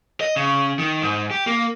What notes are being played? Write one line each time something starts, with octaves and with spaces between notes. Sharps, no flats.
D#5
C#3
D#3
G#2
G4
A#3